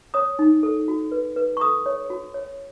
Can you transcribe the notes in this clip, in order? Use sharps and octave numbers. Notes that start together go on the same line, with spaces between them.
C#5 D#6
D#4
A4
F#4
B4
B4
C#6
A4 D#6
C#5
F#4
C#5